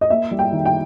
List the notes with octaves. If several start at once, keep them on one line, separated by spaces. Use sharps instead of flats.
D#5
A#3 E5
G3
G5
D#3
G5